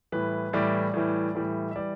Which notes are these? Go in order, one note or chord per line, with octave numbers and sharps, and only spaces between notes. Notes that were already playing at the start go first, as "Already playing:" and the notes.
A2 E3 G3 B4
A2 E3 G3 D5
A2 E3 G3
A2 E3 G3
E5
E3 G3 D5